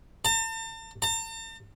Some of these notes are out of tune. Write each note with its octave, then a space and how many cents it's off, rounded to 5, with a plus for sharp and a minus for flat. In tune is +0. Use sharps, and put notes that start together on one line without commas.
A5 +40
A5 +45